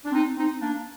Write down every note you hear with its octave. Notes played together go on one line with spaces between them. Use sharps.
D4
C4 D#4
C4 D#4
A#3 D4